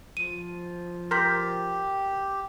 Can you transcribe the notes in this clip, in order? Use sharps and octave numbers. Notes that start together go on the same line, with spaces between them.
F3 F4 D#7
G4 A#4 C6 G6 B6